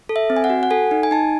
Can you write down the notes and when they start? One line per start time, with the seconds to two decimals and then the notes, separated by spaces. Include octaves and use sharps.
0.09 A4
0.16 E5
0.30 C4
0.36 G#5
0.44 F#5
0.50 F#4
0.63 F#5
0.70 A4 G#5
0.91 D#4
1.03 G#5
1.11 D#4 A5